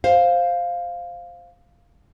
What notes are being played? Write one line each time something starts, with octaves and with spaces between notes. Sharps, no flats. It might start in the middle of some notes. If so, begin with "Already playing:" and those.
C5 F5